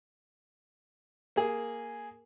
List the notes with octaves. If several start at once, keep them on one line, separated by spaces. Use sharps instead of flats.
A#3 G#4